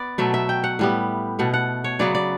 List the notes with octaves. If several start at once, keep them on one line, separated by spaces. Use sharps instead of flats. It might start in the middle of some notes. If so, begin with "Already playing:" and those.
Already playing: B3 D5
B2 F#3 A3 E5
E5
G5
F#5
A2 G3 B3
B2 A3 F#5
F#5
C#5
C#3 F#3 B3 D5
D5